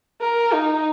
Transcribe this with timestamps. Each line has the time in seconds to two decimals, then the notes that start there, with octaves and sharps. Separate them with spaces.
0.21 A#4
0.53 D#4